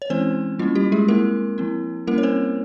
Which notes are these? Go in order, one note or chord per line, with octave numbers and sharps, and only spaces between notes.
C#5
E3 G#3 C4 C#4 E4 C5
G3 A#3 C#4 E4 F4
G3 G4
G#3 G#4
G#3 A#3 C4 E4 A#4
F3 C4 E4
G3 A#3 C#4 E4 A#4
C#5
C4 C5